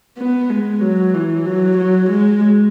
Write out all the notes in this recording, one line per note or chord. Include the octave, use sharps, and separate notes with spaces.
B3
G#3
F#3
E3
F#3
F#3
G#3